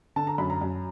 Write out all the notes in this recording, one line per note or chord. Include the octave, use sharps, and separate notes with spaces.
D3 A5
A#5
F#2 B5
A#5
F#2